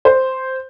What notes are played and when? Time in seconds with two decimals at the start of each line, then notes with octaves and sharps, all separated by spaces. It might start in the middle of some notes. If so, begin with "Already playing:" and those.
0.05 C5